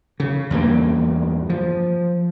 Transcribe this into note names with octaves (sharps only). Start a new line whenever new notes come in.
C#3
E2 G2 G3 A#3
F3